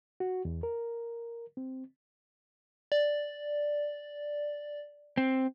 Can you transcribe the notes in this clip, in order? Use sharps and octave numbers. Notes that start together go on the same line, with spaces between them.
F#4
E2
A#4
C4
D5
C4